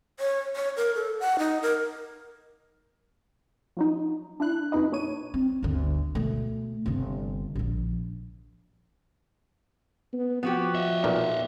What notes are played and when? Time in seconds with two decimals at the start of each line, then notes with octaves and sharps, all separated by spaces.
0.20 C#5
0.56 C#5
0.77 A#4
0.95 A4
1.20 F#5
1.39 D#4
1.62 A#4
3.77 F3 F#3 D#4
4.40 D4 E4 F#6
4.72 F2 C3 D#4 B4 D#5
4.92 A#2 D4 C#5 D#7
5.34 C4
5.63 G1 D2
6.15 B2 A3
6.86 G1 C3
7.55 A#1 F3
10.13 B3
10.43 F3 B3 F#4 G4
10.75 D#5 E5
11.04 B1 A#2